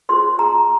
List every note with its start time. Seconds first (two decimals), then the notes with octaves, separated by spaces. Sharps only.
0.09 F4 G#4 C5 C6
0.39 A#5